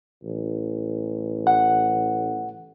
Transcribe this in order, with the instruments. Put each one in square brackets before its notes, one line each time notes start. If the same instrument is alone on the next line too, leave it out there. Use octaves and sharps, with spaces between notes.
[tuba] A1
[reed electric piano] F#5